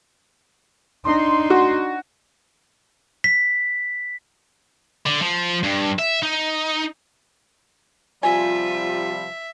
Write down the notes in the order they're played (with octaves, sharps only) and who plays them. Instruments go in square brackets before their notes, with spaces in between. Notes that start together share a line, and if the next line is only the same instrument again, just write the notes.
[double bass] D4 D#4 [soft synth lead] C6
[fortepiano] F#4
[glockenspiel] B6
[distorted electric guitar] D3
F3
G2
E5
D#4
[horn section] C3 F3 G3 [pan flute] F4 [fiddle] E5 [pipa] G#5